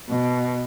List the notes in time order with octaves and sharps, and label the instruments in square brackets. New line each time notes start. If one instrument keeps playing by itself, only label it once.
[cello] B2